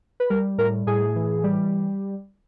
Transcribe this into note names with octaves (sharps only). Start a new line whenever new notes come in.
B4
G3 A#4
A2 A#4
A2 G#4
E3
G3